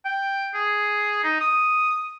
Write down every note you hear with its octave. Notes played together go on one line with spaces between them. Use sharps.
G5
G#4
D#4
D#6